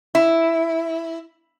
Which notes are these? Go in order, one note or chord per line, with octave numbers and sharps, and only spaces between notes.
E4